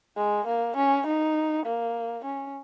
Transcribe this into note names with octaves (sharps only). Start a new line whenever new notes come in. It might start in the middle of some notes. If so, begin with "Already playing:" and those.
G#3
A#3
C#4
D#4
A#3
C#4